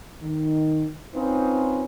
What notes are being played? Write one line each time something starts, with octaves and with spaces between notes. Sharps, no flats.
D#3
C4 C#4 D#4 F4 B4